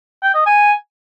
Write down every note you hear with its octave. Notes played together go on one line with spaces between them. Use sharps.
G5
D#5
G#5